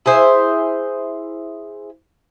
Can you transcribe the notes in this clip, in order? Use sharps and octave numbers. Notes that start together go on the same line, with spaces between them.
E4 G#4 C5 E5